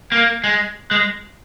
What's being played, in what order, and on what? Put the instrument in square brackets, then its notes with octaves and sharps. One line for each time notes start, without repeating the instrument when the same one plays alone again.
[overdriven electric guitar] A#3
G#3
G#3